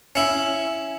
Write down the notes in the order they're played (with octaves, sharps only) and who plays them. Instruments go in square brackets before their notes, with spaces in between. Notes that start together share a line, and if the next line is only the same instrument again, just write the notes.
[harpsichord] C#4 E4